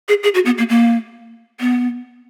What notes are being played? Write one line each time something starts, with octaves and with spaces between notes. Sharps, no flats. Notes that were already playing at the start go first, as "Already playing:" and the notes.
G#4
G#4
F#4
B3
A#3
A#3
B3